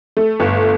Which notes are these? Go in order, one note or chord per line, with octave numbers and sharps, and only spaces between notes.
A3
G1